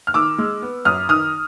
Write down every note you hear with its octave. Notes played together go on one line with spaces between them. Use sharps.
F6
D#3 D6 E6
G#3
B3
F#2 D#6 F6
D#3 D#6 F6